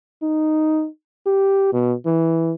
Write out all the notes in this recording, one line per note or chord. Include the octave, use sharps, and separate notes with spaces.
D#4
G4
B2
E3